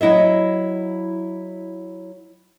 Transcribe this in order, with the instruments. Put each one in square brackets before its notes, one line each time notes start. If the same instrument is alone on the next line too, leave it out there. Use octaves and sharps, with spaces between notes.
[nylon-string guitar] F#3 E4 D#5 E5